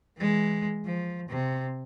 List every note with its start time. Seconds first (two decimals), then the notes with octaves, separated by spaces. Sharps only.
0.17 E3 G#3
0.85 F3
1.29 C3